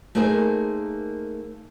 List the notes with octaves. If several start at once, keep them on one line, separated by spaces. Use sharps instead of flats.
A3 A#3 D#4 G#4 A#4 C5